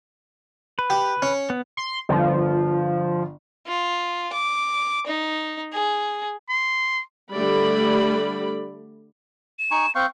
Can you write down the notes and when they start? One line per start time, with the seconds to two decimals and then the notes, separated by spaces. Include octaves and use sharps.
0.79 B4
0.90 G4
1.22 C#4
1.50 B3
1.77 C6
2.09 G1 F3
3.68 F4
4.33 D6
5.07 D#4
5.73 G#4
6.49 C6
7.32 D3 G3 A3 D5 B5
9.59 E7
9.71 D#4 G#5 C#6
9.95 C4 F5 C#6 G6